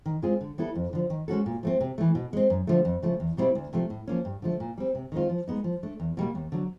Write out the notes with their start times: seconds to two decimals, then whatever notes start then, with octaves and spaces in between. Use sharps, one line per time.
0.06 D#3
0.22 G#3 C4 F4 G#4
0.41 D3
0.58 G3 B3 E4 A4
0.75 F2
0.93 D3 F3
1.10 D#3
1.28 G#3 C#4 F#4 A4
1.46 A#2
1.63 F3 A3 C4
1.81 C3
1.98 E3 A3
2.15 B2
2.33 G#3 C4
2.50 F#2
2.67 D3 F3 A3
2.85 F2
3.02 C#3 F3 A3
3.20 E2
3.37 B2 G3 C4 E4
3.55 D2
3.73 C3 F3 A3
3.90 A2
4.08 F3 A#3 C#4
4.25 G2
4.42 D3 F3 A3
4.60 A#2
4.78 G3 C4
4.95 C3
5.12 D#3 G#3 C4 F4
5.29 F3
5.48 G#3 B3 D#4
5.64 F3
5.83 A3 D4
6.00 E2
6.17 B2 G3 A#3
6.35 D#2
6.52 D3 F#3